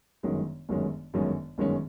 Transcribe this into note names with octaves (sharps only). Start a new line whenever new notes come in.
G1 F#2 D#3 G#3 C#4
G1 F#2 D#3 G#3 C#4
G1 F#2 D#3 G#3 C#4
G1 F#2 D#3 G#3 C#4